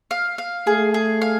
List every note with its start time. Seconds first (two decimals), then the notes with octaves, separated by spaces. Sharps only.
0.11 F5
0.38 F5
0.67 A3 G#4
0.94 G#4
1.21 F5